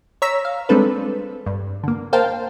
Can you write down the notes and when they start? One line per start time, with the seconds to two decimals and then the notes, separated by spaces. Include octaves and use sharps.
0.22 C#5 A#5 E6 B6
0.45 F5
0.69 G3 G#3 C4 D4 A4 B4
1.46 G2
1.84 D3 A#3
2.13 A#4 C5 F5 G5 A5